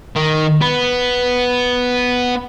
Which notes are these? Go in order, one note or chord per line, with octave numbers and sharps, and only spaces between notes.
D#3
B3